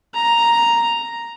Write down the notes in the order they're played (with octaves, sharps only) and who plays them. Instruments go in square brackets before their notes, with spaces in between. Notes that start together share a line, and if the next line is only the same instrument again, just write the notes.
[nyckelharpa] A#5